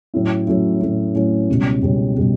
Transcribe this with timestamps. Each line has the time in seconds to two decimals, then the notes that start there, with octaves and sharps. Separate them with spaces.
0.14 A2 F#3 A3 C#4 E4
0.47 A2 F#3 A3 C#4 E4
0.81 A2 F#3 A3 C#4 E4
1.14 A2 F#3 A3 C#4 E4
1.48 C#2 B2 G3 C#4
1.82 C#2 B2 G3 C#4
2.16 B2 G3 C#4